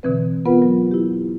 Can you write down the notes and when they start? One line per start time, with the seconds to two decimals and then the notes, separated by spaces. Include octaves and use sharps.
0.03 B2 D3 E3 C4 B4
0.46 B3 F4 A#4 B4 F#5
0.62 F#3
0.91 E4 G4